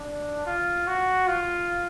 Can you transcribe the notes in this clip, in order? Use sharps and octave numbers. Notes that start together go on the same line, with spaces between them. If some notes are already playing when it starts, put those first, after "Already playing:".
Already playing: D4
F4
F#4
F4